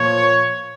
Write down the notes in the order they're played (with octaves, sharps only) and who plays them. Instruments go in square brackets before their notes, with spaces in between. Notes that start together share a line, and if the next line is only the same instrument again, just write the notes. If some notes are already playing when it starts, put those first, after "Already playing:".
Already playing: [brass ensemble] A#2 F3 C#5